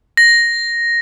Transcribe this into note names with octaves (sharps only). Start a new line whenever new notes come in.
A#6